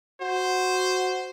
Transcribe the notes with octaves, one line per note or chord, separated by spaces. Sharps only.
F#4 C5